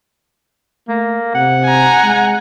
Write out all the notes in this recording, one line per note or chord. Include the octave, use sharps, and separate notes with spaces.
A3 A#3
C3 F#5
G#5 A#5
G#3